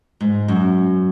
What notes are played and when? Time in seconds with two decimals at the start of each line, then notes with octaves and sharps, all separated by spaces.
0.21 G#2
0.48 F#2